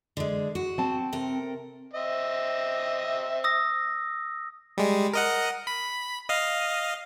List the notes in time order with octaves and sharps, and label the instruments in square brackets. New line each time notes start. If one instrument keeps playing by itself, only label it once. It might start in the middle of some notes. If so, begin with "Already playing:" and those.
[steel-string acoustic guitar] D3 G#3
F#4
[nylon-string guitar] C4 A5
[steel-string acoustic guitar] C3 A4 A#4
[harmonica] C4 D#5 E5
[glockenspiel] D#6 E6 A#6
[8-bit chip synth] G3 G#3
A#4 D#5 F#5
B5
D#5 F5